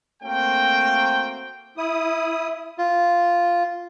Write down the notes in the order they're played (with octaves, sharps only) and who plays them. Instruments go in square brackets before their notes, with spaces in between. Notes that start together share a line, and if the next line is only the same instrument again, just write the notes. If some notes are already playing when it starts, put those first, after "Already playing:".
[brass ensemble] A3 A#3 C4 F#4 G5
[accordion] E4 D#6
[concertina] F4